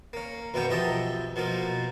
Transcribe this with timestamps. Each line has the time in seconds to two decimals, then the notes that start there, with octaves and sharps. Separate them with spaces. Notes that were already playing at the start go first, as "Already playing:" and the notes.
0.13 A#3 C#4
0.54 F#2 B2 A#3 B3 C#4 G5
0.69 B1 F2 G4 D#5 E5 A5
1.36 B2 F3 A#3 F4